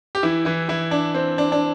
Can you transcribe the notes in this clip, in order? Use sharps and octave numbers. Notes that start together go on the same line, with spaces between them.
G4
E3 E4
E3 E4
E3 E4
D4
C4
D4
D4